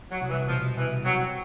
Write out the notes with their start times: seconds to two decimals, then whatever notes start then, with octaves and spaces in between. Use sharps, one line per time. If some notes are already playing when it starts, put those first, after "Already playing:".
0.12 F#3
0.22 C2
0.30 E3
0.48 B2 F3
0.76 C2 E3
1.04 F#3 C4